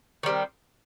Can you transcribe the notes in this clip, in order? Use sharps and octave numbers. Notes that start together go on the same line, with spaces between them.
D#3 G3 C4